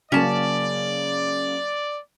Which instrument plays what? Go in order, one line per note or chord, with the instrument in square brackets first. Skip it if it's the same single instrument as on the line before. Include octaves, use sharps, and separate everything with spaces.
[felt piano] C#3 F#3 A#3 [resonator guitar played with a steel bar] C#4 A5 [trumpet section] D5